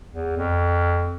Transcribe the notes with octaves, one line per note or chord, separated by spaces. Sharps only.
E2
F2